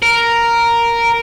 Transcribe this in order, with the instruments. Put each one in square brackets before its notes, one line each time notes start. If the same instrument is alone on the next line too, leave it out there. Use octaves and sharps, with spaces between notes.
[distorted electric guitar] A#4